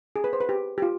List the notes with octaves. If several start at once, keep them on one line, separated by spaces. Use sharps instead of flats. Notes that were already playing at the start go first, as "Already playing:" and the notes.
G#4
B4
C5
B4
G4
G4
F4